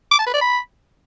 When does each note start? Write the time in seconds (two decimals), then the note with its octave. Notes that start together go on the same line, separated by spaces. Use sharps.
0.11 D6
0.19 A5
0.26 B4
0.34 D5
0.41 B5